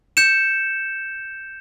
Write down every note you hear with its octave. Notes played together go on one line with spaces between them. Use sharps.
G6 C#7 E7